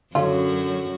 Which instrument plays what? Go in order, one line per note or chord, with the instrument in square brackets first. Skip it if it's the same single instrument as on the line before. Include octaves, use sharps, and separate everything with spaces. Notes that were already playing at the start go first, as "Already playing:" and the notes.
[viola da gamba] F#2 F#4 [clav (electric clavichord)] D3 F#3 [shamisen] C#4 F4